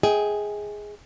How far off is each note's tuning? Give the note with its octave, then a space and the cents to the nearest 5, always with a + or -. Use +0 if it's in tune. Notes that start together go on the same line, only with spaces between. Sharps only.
G#4 +0 D#5 +40 G5 +0